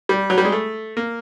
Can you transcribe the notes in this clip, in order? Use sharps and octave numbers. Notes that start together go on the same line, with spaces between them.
G3
F#3
G3
G#3
A3
A#3